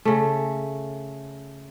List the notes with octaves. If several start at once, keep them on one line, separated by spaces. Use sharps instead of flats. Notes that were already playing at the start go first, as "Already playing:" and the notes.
C#3 A3